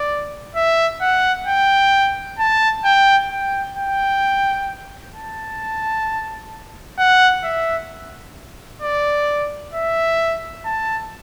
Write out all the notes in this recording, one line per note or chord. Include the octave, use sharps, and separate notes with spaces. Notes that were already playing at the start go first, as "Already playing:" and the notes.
Already playing: D5
E5
F#5
G5
A5
G5
G5
G5
A5
F#5
E5
D5
E5
A5